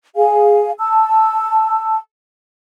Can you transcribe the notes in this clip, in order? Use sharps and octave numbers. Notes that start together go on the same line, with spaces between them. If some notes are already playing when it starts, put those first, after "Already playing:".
G#4 F5 G#5
A5 E6